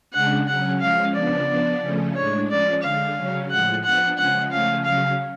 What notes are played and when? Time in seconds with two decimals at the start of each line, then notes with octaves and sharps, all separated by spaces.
0.13 C#3 G#3 D4 F#5
0.47 C#3 F#3 C#4 F#5
0.81 F3 G#3 C#4 F5
1.15 C#3 F3 B3 D4 D5
1.48 F3 B3 D4
1.82 C#3 F3 A3 C#4
2.15 A2 G#3 D4 C#5
2.49 F3 G#3 C#4 D5
2.83 D3 G#3 D4 F5
3.17 C#3 F#3 C#4
3.50 A2 F3 G#3 F#5
3.84 F3 B3 D4 F#5
4.18 C#3 F3 G#3 C#4 F#5
4.51 C#3 F3 A3 C#4 F5
4.85 C#3 F#3 C#4 F5